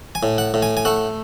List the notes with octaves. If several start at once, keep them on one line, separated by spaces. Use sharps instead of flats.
G#5
A2
F#5
A2
G#5
G#5
A3 F#5